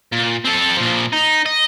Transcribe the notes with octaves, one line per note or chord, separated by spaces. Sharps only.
A#2
C4 A4
A#2 F3
D#4
D#5